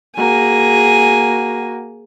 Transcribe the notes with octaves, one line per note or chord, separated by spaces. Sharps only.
A#3 F#4 G#4 G#5